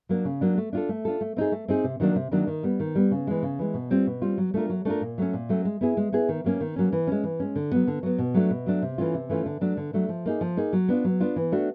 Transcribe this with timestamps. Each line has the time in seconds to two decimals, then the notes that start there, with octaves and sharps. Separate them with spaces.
0.09 F#3 A#3 D4
0.25 C#3
0.41 F#3 A#3 D4
0.58 A3
0.73 D4 F4 A4
0.89 A3
1.05 D4 F4 A4
1.21 A3
1.37 C4 D#4 G#4
1.52 A3
1.68 C4 D#4 G#4
1.84 C3
2.00 D#3 F#3 A#3 D4
2.15 C3
2.31 D#3 F#3 A#3 D4
2.47 D#3
2.63 G3 B3
2.80 D#3
2.95 G3 B3
3.11 C#3
3.27 E3 G#3
3.43 C#3
3.59 E3 G#3
3.74 B2
3.91 G3 C4 F4
4.07 B2
4.22 G3 C4 F4
4.38 F#3
4.54 A3 D4 F4 A#4
4.69 F#3
4.85 A3 D4 F4 A#4
5.01 A#2
5.18 F#3 A3 C#4
5.33 A#2
5.49 F#3 A3 C#4
5.65 G#3
5.81 B3 E4 G#4
5.97 G#3
6.12 B3 E4 G#4
6.29 D#3
6.44 F#3 A#3 C#4
6.60 D#3
6.76 F#3 A#3 C#4
6.92 E3
7.07 G#3 C#4
7.24 E3
7.40 G#3 C#4
7.56 D3
7.72 F#3 B3
7.87 D3
8.03 F#3 B3
8.18 B2
8.34 F#3 A3 D4
8.50 B2
8.66 F#3 A3 D4
8.82 C3
8.98 E3 A3 C#4 F4
9.14 C3
9.29 E3 A3 C#4 F4
9.46 D3
9.61 F#3 A3 D4
9.77 D3
9.93 F#3 A3 D4
10.09 F3
10.26 A#3 D#4 G#4
10.41 F3
10.57 A#3 D#4 G#4
10.73 F#3
10.88 B3 D4 F4
11.04 F#3
11.20 B3 D4 F4
11.36 E3
11.52 A3 D4 F#4